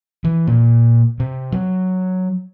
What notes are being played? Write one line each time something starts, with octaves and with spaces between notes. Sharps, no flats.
E3
A#2
C3
F#3